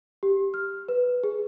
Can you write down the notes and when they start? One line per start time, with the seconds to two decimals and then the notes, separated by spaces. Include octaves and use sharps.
0.23 G4
0.54 F6
0.88 B4
1.24 G#4